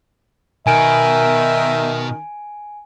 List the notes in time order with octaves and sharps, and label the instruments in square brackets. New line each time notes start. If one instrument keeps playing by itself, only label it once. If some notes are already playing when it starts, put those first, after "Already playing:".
[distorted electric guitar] B2 [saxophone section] D#3 [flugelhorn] E5 [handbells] G#5 D7